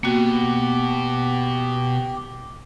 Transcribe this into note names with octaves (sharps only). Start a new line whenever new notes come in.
B2 A#3 F#4 G4